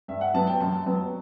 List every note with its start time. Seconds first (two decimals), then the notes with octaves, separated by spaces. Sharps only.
0.08 G2 E5
0.21 F#5
0.34 F#3 B3 A5
0.47 G5
0.60 F#2 A5
0.86 F#3 B3